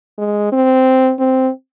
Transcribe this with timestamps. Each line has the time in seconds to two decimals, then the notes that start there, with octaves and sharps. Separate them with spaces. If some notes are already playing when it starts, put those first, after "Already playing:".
0.18 G#3
0.52 C4
1.19 C4